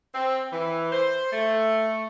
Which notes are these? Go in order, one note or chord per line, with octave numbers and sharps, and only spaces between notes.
C4
E3
C5
A3